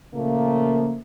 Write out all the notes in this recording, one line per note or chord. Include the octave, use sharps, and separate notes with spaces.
A#2 C#3 F3 A3 A#3